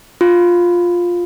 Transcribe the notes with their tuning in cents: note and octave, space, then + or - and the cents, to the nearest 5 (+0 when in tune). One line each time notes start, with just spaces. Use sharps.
F4 +10